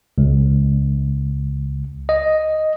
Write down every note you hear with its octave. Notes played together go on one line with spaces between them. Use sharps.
C#2
D#5